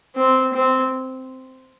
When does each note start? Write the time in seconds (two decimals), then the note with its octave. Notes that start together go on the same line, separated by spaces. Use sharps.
0.16 C4
0.53 C4